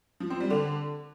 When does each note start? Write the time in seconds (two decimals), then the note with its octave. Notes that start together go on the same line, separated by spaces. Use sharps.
0.20 F3
0.30 C4
0.40 G3
0.50 D3